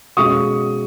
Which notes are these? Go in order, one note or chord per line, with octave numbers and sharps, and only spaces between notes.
B2 G#3 C#4 C#6 D#6